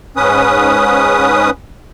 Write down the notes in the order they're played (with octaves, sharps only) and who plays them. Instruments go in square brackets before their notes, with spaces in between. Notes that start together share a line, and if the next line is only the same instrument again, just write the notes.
[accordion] G#2 C#4 B4 D#6